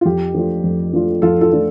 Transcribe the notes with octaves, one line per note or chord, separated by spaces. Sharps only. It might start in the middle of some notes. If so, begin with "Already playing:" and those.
F4
F2 G4
F3 A3 D4 F4
F2
F3 A3 D4 F4
F2 F4 A4
F4 A4
F3 A3 D4 F4